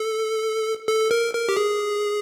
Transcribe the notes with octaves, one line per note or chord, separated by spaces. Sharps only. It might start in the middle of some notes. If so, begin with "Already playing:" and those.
Already playing: A4
A4
A#4
A#4
G4
G#4